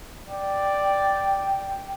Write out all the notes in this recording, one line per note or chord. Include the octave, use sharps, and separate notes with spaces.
D5 G5